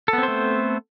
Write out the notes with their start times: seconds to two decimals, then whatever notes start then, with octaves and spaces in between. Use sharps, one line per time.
0.08 A4
0.13 B3
0.18 C4
0.23 C5
0.28 A3